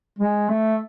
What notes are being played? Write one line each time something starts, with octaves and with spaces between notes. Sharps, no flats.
G#3
A3